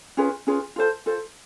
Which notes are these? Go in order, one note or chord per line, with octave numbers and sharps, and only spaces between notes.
C#4 F4 G#4 B4
C#4 F4 G#4 B4
F4 A4 C5
F4 A4 C5